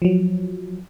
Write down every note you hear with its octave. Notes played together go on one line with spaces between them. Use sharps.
F3 F#3